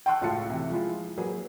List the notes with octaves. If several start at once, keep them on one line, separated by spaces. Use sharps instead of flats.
G5 A5 C6 C#6 E6 F#6
C#2 A2 F4 F#4 A5 C#7
C3 E3
F3 G#3 E4 F4
F#3 A#3 F#4 G#4 B4